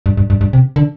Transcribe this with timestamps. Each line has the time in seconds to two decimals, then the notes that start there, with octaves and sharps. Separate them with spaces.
0.06 G2
0.17 G2
0.30 G2
0.41 G2
0.53 C3
0.76 D3